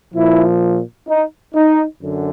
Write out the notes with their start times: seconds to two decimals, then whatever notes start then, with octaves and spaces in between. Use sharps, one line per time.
0.14 A#2 F3 E4
1.08 D#4
1.54 D#4
2.01 F#2 D3